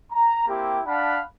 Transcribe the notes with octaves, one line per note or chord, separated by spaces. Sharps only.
A#5
A#3 C4 E4 G4
D4 F5 F#5 A5 B5